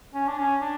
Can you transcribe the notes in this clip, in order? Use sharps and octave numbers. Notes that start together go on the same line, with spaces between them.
C#4
D4
C#4
D4